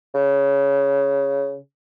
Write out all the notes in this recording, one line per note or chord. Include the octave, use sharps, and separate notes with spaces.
C#3